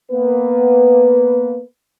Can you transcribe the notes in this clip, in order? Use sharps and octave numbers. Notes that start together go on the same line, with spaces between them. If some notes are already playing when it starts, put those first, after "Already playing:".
A#3 B3 B4